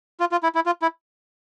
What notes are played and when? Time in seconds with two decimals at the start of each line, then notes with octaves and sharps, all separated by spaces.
0.20 F4
0.32 F4
0.43 E4
0.55 E4
0.66 F4
0.82 E4